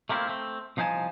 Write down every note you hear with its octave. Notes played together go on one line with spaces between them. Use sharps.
A3 A#3 C4 E4 F4
A3 C4
C2 F3 D#4 B4 G#5 A5